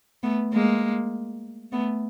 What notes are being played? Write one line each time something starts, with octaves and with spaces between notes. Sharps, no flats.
A3 B3
G#3 A#3
A3 B3